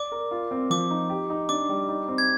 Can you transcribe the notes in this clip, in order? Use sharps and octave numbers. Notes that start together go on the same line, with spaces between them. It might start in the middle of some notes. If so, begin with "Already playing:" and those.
Already playing: D5 D6
A#4
F4
C4
F3 D6
D#4
G4
D#4
D4 D6
G3
D#4
C4
G#6